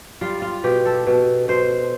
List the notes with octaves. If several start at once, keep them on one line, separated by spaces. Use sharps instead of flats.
G3 F4
F4
B2 G4
A4
B2
B2 C5